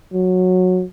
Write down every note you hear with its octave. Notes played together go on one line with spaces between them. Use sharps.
F#3